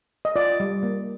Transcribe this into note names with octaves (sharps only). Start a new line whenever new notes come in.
D#5
F4 D5
G3
A#3